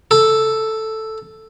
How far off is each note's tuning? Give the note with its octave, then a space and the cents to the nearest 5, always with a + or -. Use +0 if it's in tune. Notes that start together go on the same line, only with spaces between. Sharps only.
A4 +0